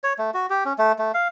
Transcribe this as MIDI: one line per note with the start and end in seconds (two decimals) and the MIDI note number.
0.04 0.13 73
0.18 0.31 57
0.34 0.46 66
0.50 0.64 67
0.65 0.73 61
0.78 0.92 57
0.98 1.12 57
1.14 1.28 77